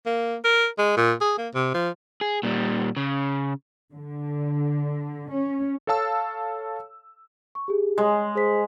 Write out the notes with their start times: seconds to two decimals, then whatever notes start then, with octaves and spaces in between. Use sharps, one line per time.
0.06 A#3
0.44 A#4
0.78 G#3
0.97 A#2
1.21 G#4
1.38 A#3
1.54 C3
1.74 F3
2.21 G#4
2.43 A#2 G3
2.97 C#3
3.93 D3
5.30 C#4
5.87 A4 C#5 F5 A5 E6
7.55 C#6
7.68 G4 G#4
7.98 G#3 D#6
8.35 G#4 C5 B6